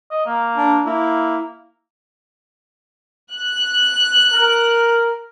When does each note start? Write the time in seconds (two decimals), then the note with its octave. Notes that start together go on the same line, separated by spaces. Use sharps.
0.10 D#5
0.26 A#3
0.56 D4
0.86 A#3 E4
3.33 F#6
4.33 A#4